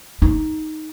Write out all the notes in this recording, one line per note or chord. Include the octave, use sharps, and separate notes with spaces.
D#4